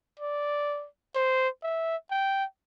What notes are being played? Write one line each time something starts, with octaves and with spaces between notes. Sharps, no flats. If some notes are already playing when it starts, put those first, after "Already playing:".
D5
C5
E5
G5